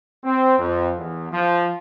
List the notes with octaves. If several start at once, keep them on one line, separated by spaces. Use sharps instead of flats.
C4
F2
E2
F3